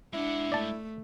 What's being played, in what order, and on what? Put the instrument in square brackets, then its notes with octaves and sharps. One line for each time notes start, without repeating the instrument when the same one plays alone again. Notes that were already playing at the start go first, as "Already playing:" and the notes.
[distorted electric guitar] G#3 F#5 [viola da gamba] D4 [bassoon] E4
[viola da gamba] A3 [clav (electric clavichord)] D5 A5